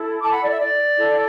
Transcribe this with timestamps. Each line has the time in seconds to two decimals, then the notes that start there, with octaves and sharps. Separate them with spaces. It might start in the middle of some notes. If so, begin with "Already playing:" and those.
Already playing: E4 A4
0.22 A5 D6
0.31 F#5 B5
0.41 D5
0.50 E5
0.59 D5
0.97 E4 A4